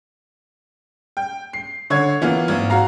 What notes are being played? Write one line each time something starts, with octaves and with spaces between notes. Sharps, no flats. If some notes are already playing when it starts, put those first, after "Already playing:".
G5
C7
D3 C#5 G#6
E3 A#3 B3 F4
G#1
F#4 F5 A#5